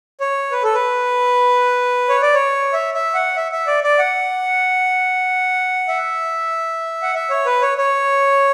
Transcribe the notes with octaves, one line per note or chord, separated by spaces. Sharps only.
C#5
B4
A4
B4
C#5
D5
C#5
E5
E5
F#5
E5
E5
D5
D5
F#5
E5
F#5
E5
C#5
B4
C#5
C#5